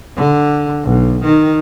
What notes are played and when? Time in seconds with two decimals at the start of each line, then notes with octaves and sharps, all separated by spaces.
0.17 D3
0.84 B1
1.24 D#3